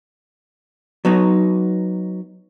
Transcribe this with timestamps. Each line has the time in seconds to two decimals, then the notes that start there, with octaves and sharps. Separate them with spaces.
1.05 F#3 B3 D#4